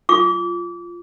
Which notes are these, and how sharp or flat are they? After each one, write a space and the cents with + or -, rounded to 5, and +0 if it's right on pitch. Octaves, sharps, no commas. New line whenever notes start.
F4 -10 D6 -30